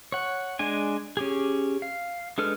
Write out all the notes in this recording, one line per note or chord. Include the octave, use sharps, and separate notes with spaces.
C#5 F#5
G#3 D4 G#5
C#4 G4 G#4
F5
G#3 D4 A4 B4 F6